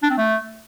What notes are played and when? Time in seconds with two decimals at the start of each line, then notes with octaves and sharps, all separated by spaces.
0.03 D4
0.10 C4
0.18 A3